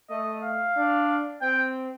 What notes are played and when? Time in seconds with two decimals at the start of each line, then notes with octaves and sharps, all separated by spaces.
0.10 A3 D#5
0.44 F5
0.76 D4
1.42 C4 G5